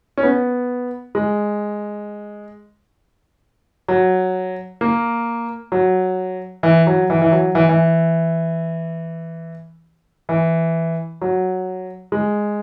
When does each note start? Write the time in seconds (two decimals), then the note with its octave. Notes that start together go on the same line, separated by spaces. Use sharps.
0.17 C#4
0.23 B3
1.15 G#3
3.88 F#3
4.81 A#3
5.72 F#3
6.63 E3
6.87 F#3
7.10 E3
7.22 E3
7.32 F#3
7.55 E3
7.69 E3
10.29 E3
11.21 F#3
12.12 G#3